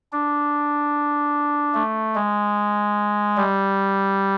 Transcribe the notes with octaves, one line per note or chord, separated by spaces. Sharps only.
D4
A3
G#3
G3